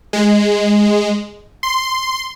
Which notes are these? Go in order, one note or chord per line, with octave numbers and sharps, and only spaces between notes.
G#3
C6